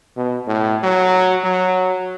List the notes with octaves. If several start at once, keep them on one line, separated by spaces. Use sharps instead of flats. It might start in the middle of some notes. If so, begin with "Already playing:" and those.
B2
A2
F#3
F#3